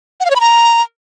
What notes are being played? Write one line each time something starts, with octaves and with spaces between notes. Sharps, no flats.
F#5
F5
C#5
B5
A#5